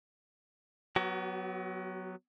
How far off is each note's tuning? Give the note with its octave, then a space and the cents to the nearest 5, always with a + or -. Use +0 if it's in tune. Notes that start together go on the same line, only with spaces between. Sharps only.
F#3 +0 B3 +0 F#4 +45